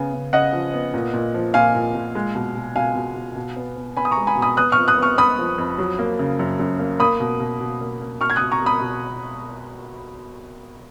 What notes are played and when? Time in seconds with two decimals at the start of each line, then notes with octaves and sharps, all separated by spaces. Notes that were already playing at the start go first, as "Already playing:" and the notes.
Already playing: C#3 B3 G#5
0.13 C#3
0.33 C#3 D#5 F#5
0.53 F3
0.74 B3
0.94 A#2
1.13 A#2
1.34 F3
1.54 A#2 F5 G#5
1.75 A#2
1.95 A#2
2.15 G#3
2.35 B2
2.55 B2
2.75 B2 F5 G#5
2.95 B2
3.16 B2
3.36 B2
3.56 B3
3.77 B3
3.97 B3 G#5 B5
4.05 D#6
4.11 A#5 C#6
4.17 G#3
4.27 G#5 B5
4.37 B2
4.42 B5 D#6
4.57 B3 D#6 F#6
4.72 C#6 F6
4.78 F2
4.88 D#6 F#6
4.98 B3 C#6 F6
5.18 B3 B5 D#6
5.39 F3
5.58 F2
5.78 F#3
5.99 A#3
6.19 C#3
6.39 F#2
6.60 F#2
6.79 A#3
7.00 A#3 B5 D#6
7.20 B2
7.40 B2
7.61 B2
7.81 A#3
8.02 A#3
8.21 B2 C#6 F6
8.30 G#6
8.36 B2 D#6 F#6
8.52 A#5 C#6
8.62 B2 B5 D#6
8.81 B2